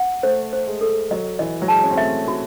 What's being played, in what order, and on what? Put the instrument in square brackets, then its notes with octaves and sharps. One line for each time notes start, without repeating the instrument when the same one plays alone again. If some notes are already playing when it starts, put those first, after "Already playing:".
Already playing: [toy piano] F#5
[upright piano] A3 [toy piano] C5
[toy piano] C5
[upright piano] G#3
[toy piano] A4
[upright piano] F#3 [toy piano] D#5
[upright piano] E3 [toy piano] D#5
[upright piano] F#3
[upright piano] G#3 [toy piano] A5
[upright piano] C#4
C4
[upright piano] A3 [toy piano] E5
[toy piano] F#4